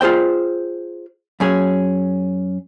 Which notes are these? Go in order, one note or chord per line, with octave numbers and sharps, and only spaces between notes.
F4 G#4 C5 G5
F#2 C#4 G#4